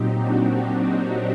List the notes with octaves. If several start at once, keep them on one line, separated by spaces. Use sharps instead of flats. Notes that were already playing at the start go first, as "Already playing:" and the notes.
Already playing: A#2 F#3 C4 D#4 G4
D4 F#4